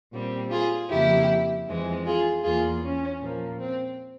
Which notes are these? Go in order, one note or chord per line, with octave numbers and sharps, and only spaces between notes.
A#2 G3 C4
F4 G#4
F2 C#3 F3 A#3 E4 G4
F2 E3 G#3 C4
F4 G#4
E2 E3 A#3 F4 G#4
C#4
A#2 F3 A#3
C4